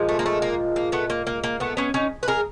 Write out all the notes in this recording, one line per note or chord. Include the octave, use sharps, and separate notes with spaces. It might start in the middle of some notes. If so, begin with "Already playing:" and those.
Already playing: A#2 F3 G#3
A3
A#3
A3
A#3
A#3
A3 B3
A#3
A#3
A#3
A3 B3
B3 C#4
C#4 D#4
B4
G#4 A#4